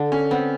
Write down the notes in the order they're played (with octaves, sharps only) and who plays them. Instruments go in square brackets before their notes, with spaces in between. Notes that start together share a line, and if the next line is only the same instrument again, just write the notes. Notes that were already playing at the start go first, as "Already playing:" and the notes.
Already playing: [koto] D3
[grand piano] C#4
[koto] B3 [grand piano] C4